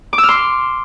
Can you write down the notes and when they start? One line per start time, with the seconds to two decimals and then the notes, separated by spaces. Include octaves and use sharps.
0.13 D6
0.18 E6
0.23 F6
0.29 C6